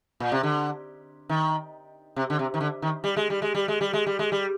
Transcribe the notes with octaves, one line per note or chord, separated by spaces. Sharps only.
A#2
C3
D3
D#3
C3
D3
C3
D#3
D3
D#3
G3
G#3
G3
G#3
G3
G#3
G3
G#3
G3
G#3
G3